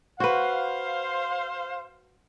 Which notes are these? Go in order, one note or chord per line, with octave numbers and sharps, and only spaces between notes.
F#4 B4 C5 F5